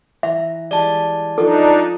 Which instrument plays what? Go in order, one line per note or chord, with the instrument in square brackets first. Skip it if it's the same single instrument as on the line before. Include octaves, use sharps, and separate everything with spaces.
[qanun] E3 A#5 [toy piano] E5
[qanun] E3 G3 G#3 [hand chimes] D5 A5
[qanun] F3 F4 [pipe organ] D4 D#4 [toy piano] A4